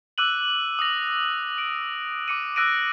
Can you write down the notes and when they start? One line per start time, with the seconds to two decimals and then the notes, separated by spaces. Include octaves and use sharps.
0.18 D6 E6 F#6 D#7 F#7
0.79 D#6 A#6
1.58 D7
2.28 D6 C#7 D#7
2.56 E6 F#6 A#6 D7 D#7